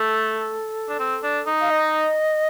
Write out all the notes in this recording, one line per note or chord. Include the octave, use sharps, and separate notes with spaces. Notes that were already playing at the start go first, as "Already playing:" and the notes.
Already playing: A3 A4
D4
C4
D4
D#4
F5
D#5